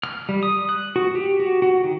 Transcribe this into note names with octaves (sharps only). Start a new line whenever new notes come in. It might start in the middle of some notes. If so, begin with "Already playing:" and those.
F6
G3
D#6
F#6
F#4
G4
F#4
F#4
D#3